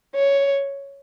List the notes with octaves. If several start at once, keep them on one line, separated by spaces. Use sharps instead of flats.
C#5